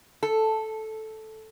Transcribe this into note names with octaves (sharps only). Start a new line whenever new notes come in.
A4